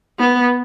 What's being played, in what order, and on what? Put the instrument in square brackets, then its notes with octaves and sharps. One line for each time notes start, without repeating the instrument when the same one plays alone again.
[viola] B3